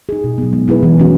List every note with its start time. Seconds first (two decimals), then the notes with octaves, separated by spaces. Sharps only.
0.09 D#4 G#4
0.24 B2
0.38 F#3 B3
0.53 G#3
0.68 B3 E4 G#4 B4
0.83 E3
0.98 A3 C#4 F#4